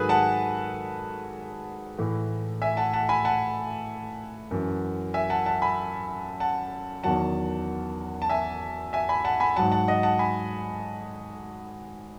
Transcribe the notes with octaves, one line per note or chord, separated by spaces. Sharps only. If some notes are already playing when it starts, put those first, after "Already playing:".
Already playing: G#2 D#3 F#3 F#4 G#4 A4 B4 G#5
F#5 A5
A2 E3
E5 G#5
F#5 A5
F#5 A5
G#5 B5
F#5 A5
F#2 E3
E5 G#5
F#5 A5
F#5 A5
G#5 B5
F#5 A5
E2 D#3 F#3 F#5 A5
A5
E5 G#5
E5 G#5
G#5 B5
F#5 A5
G#5 B5
G#2 F#3 F#5 A5
F#5 A5
D#5 F#5
F#5 A5
G#5 B5